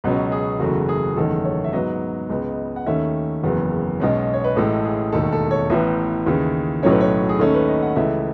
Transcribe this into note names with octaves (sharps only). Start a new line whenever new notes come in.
C#2 B2 F#3 C#4 B4
G#4
F#1 E2 C#3 F#3 A3 F#4
G#4
F#1 E2 D#3 A3 C#4 A4
C#5
E5
G#2 F#3 B3 D#5
C#2 C#3 G#3 B3
F#5
D#2 D#3 A3 C#4 E5
F#1 E2 C#3 F#3 B3
B1 B2 G#3 C#4
C#5
B4
A1 A2 G#3 A4
G#4
E1 D#2 D#3 A3 A4
A4
C#5
A1 A2 E3 B3 E5
D#2 C#3 E3
B1 A2 F#3 A3 C#4 C#5
B4
C#5
F#4
G#4
D#2 D#3 A3 C#4 A4
B4
D#5
F#5
C#2 C#3 E3 A3 E5